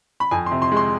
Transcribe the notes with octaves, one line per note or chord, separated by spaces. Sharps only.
B5
F2 G#5
C6
C3
C6
G#3
C6